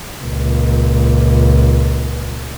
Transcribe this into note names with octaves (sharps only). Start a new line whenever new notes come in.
C#2 A#2